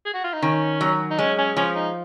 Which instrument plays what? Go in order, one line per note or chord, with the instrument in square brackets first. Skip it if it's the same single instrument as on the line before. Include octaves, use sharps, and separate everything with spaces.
[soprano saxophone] G#4
F#4
F4
D#4
[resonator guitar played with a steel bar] D#3 [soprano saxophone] C#4
[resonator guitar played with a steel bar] F#3
[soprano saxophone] D#4
[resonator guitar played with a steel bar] G#3 [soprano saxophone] C#4
[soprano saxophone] C#4
[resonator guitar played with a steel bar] F3 [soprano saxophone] C#4
[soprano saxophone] D#4